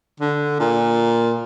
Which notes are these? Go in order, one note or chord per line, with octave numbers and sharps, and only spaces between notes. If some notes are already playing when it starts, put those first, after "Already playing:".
D3
A#2